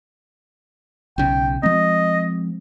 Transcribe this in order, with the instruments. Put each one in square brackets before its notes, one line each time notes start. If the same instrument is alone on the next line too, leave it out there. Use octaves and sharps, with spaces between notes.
[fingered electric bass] B1 C#3 [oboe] G5
[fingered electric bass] F3 G#3 C4 [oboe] D#5